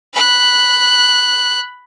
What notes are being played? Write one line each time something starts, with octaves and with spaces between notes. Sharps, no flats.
B5 F#6